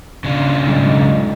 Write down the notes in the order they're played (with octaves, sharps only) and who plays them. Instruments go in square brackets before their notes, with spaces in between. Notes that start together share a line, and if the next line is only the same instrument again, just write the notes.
[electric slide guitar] C#3 D4 F4
[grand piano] B1 G#2